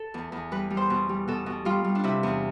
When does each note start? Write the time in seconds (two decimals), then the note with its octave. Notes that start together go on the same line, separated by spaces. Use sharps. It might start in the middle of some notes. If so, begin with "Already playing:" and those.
Already playing: A4
0.14 E2
0.32 E2
0.52 G3 B4
0.70 G3
0.77 C5
0.90 B2
1.09 G3
1.28 B2 A4
1.46 B2
1.65 G3 F4
1.84 G3
1.95 D4
2.04 C3 E4
2.23 E2